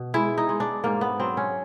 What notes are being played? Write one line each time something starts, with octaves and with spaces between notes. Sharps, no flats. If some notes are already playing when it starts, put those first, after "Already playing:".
Already playing: B2
G#3 E4
D#4
G#3
D4
G#2 A#3
B3
F#3 C4
C#4